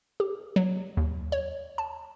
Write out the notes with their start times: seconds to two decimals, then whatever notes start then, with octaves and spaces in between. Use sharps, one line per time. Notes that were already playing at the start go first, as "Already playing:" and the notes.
0.20 G4
0.56 F#3
0.97 D#2
1.32 C#5
1.78 A5